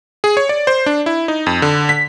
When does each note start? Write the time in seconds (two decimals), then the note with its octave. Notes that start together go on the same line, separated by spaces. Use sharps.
0.24 G#4
0.37 C#5
0.49 D5
0.67 C5
0.86 D4
1.06 E4
1.28 D#4
1.47 F2
1.62 D3
1.89 B6